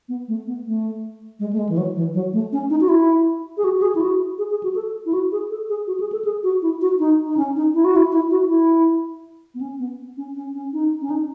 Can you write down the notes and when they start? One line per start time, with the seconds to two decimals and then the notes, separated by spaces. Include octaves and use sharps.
0.09 B3
0.28 A3
0.46 B3
0.66 A3
1.40 G#3
1.53 A3
1.58 G#3
1.69 E3
1.78 F#3
1.96 E3
2.14 F#3
2.33 A3
2.52 C#4
2.70 D#4
2.81 F#4
2.89 E4
3.57 G#4
3.64 F#4
3.77 F#4
3.82 G#4
3.95 E4
4.01 F#4
4.38 G#4
4.51 G#4
4.63 F#4
4.75 A4
5.06 E4
5.13 F#4
5.32 G#4
5.50 A4
5.69 G#4
5.87 F#4
6.00 G#4
6.12 A4
6.25 G#4
6.43 F#4
6.62 E4
6.81 F#4
6.99 D#4
7.27 D#4
7.37 C#4
7.56 D#4
7.74 E4
7.84 F#4
7.96 E4
8.12 E4
8.31 F#4
8.49 E4
9.55 B3
9.61 C#4
9.79 B3
10.17 C#4
10.36 C#4
10.55 C#4
10.73 D#4
11.01 C#4
11.10 D#4